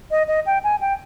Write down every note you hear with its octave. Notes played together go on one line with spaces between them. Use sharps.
D#5
D#5
G5
G#5
G5